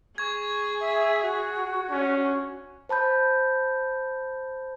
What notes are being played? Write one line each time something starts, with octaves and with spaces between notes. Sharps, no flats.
G#4 C#6 G#6
E5
F#4
C#4 D4
C5 A5 B5 G6